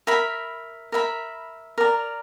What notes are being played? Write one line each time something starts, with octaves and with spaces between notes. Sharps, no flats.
A#4 E5 B5
A#4 E5 B5
A#4 D5 A#5